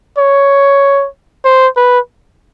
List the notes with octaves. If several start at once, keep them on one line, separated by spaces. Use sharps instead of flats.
C#5
C5
B4